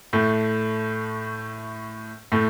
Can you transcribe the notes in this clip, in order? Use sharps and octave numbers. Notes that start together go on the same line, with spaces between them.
A2 A3
A2 A3